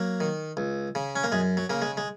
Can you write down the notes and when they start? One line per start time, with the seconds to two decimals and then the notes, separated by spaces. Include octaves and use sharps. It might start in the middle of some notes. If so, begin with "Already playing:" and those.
Already playing: F#3 A#3
0.20 D#3
0.57 C#2
0.95 C#3
1.15 C#4
1.24 A#3
1.32 F#2 G#3
1.57 F#3
1.70 C#3 A#3
1.82 G#3
1.97 G#3